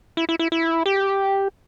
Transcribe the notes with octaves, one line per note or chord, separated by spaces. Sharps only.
E4
E4
E4
E4
G4